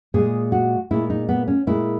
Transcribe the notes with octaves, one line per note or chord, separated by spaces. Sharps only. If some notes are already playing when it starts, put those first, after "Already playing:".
A#2 G#3 G#4
F#4
A#2 G#3 E4
D#4
B3
C#4
A#2 G#3 E4